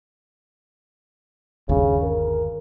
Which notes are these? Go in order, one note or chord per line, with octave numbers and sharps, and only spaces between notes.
G1 D#2 C#3
A#4